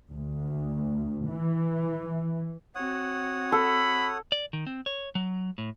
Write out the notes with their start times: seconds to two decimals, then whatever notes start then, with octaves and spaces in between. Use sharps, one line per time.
0.11 D2
1.28 E3
2.75 C4 F#4 C#5 F#5 D#6
3.52 A4 B5
4.32 D5
4.53 D#3
4.67 C4
4.86 C#5
5.15 F#3
5.58 A2